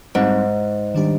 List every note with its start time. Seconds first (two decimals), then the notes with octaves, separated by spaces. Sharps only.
0.15 G#2 G3 C4 D#4
0.95 D#3 G3 D4 G4